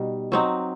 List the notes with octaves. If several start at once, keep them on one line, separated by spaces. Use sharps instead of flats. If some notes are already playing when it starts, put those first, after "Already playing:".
Already playing: B2 G3 D#4
F#3 C4 D#4